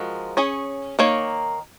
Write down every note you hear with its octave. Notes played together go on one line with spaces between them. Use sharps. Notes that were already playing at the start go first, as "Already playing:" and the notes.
Already playing: F3 G#3 F#4 A#4
C#4 G#4 C#5
D#3 A#3 C#5